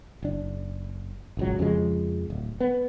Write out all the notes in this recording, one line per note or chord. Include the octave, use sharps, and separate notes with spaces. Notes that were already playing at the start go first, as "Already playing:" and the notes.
F#1 D4
G#1 C#2 F#3
F2 C#3 F3 G#3
D1
B3